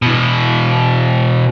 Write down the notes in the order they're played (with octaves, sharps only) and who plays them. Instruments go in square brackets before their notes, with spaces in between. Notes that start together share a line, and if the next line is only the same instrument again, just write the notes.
[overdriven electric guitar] B2 E3